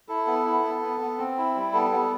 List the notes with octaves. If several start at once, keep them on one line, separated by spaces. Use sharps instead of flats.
E4 A4
B3
E4
B3
B3
B3
C4
E4
G3
B3 A4
B3